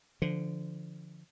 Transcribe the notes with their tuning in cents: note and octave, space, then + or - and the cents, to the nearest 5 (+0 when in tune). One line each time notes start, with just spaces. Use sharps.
D3 +0 F3 -20